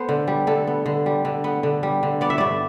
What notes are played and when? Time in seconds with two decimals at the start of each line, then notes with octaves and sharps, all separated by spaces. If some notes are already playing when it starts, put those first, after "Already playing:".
Already playing: B3 A4 C5
0.09 D3
0.28 G3
0.47 D3 A4
0.67 B3
0.86 D3
1.06 G3
1.25 D3
1.44 B3
1.63 D3
1.83 G3
2.03 D3
2.21 B3 D5
2.30 E5
2.38 G2 D5